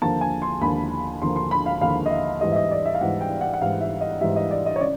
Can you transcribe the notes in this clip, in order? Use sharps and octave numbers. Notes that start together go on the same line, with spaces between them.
D#2 D3 F3 A#3 A5
G#5
C6
D#2 D3 F3 A#3 B5
D#2 D3 F3 A#3 C6
C6
B5
F5
D#2 D3 F3 A#3 F5
D#5
E5
G#2 E3 G3 D#5
E5
D#5
D5
E5
F5
G#2 E3 G3 F#5
G5
F#5
F#5
G#2 E3 G3 F5
E5
D#5
G#2 E3 G3 E5
D#5
D5
D#5
C#5
C#3 D5